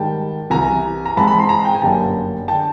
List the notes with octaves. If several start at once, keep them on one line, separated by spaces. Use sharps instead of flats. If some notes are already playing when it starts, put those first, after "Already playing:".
Already playing: G#2 D#3 G3 G5 A5
C2 C3 E3 G#5 A#5
A#5
G#2 E3 G#3 C4 A5 B5
A5 B5
A#5 C6
G#5 A#5
G5
G#5
G1 F#2 D3 G3 A#3 G5 A5
D3 G5 A5